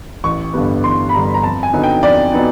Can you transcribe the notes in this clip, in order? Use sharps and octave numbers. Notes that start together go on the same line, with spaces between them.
A1 C#6
G2 D3 G3 B3
A1 C6
B5
G2 D3 G3 B3 A#5
A#5
F2 A5
G#5
D3 F#3 B3 D#4
G5
F2 D5
F#3 B3 D#4